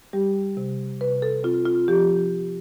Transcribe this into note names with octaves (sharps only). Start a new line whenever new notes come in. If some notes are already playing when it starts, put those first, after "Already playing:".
G3 G4
C3
C3 B4
A4
C4 F4
F4
F3 G4